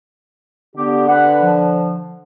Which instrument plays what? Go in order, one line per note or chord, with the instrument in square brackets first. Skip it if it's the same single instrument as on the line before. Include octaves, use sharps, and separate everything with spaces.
[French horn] D3 [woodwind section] B3 G4
[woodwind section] B4 F#5
F3